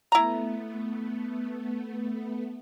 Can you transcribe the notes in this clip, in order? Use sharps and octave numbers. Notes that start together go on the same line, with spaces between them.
A3 B3 E4 A#5